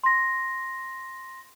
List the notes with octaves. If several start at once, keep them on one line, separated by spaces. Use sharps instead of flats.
C6 A#6